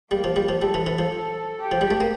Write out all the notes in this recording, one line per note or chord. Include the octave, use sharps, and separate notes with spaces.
G3 A#3
F3
G3
F3
G3 A4
E3
E3
F3
G4
F3
G3
A3
A#3